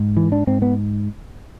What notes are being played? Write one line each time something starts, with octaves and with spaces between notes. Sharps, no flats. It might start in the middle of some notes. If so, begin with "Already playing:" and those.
Already playing: G#2
E3
D4
G#2 C4
B3